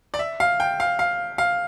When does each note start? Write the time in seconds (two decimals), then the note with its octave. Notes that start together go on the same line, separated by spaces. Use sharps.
0.14 D5
0.19 E5
0.40 F5
0.60 G5
0.80 F5
0.99 F5
1.38 F5